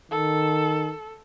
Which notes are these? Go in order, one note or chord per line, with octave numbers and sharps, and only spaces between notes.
D#3 A4